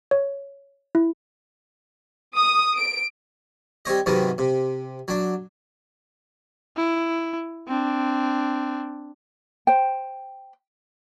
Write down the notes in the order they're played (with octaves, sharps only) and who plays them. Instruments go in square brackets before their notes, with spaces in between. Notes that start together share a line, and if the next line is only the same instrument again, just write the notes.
[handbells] C#5
E4
[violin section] D#6
D7
[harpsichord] G3 C4 C#5 D#5
G#2 C3 D#3 F#3 B3
C3
F#3 D4
[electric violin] E4
C4 D4
[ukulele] C5 G5